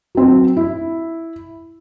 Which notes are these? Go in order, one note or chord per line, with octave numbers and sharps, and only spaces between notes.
F#3 C4
E4